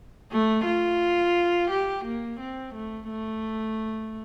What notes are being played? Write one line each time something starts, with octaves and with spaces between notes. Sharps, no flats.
A3
F4
G4
A#3
C4
A3
A3